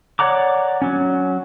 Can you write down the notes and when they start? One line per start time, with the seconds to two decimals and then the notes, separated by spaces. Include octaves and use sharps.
0.19 C#5 D5 F#5 A#5 D6
0.82 F#3 C#4